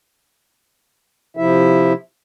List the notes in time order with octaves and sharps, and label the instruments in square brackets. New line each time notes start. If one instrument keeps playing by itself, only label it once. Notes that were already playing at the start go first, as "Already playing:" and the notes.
[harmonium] C3 F3 E4 E5